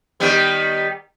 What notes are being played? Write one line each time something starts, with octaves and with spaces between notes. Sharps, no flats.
D#3 G3 B3